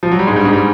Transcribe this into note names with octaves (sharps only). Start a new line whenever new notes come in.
F3
F#3
G3
G#2 G#3
G2 G3
G#2 G#3
G3